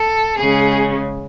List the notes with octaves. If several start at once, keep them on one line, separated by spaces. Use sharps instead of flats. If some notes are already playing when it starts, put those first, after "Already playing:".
Already playing: A4
C#3 G#3 C#4 G#4